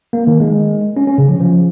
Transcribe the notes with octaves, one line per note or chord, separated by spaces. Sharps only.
A#3
D#3
G#3
C#4
C#4
C#3
F3
F3